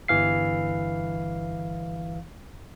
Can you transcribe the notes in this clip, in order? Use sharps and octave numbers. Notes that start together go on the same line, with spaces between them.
G1 E3 F5 C7